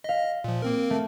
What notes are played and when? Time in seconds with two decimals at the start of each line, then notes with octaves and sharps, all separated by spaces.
0.04 D#5 F5 B6
0.44 A#2 F3
0.62 A#3 C4 A#4
0.90 A3